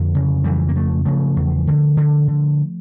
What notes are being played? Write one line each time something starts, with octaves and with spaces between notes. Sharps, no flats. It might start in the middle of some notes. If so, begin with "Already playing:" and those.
Already playing: F2 D3 F3
C#3
F2 E3 G3
A#3
C#3 F3 A3
C#3 F3 A3
E2
D3
D3
D3